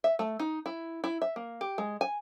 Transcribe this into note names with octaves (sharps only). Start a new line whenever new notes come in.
E5
A3
D#4
E4
E4
E5
A#3
G4
G#3
G#5